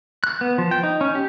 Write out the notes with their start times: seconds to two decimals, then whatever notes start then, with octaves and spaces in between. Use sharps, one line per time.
0.24 F#6
0.41 B3
0.58 F3
0.71 G5
0.83 D#4
1.01 C#4
1.15 G4